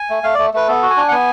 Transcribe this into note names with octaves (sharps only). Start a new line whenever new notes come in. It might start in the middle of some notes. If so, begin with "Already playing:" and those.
Already playing: G#5
A3
A3 F5
A3 D5
A3 B4
B3 A4
F#4
G#5
D4
F#5
B3 G#5